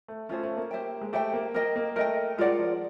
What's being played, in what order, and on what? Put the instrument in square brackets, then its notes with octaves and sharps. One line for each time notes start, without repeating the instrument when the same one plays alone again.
[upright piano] A3
[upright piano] A3 [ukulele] C#4 F4 G#4 C5
[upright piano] A3
A#3
[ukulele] G4 C5 E5 G5
[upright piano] G#3
[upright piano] A3 [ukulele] G4 C5 E5 G5
[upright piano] A#3
[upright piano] A#3 [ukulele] A#4 D#5 G5
[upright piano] A#3
[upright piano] A3 [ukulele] A#4 D#5 G5
[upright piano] G#3 [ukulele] F4 A#4 D5 F#5
[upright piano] F3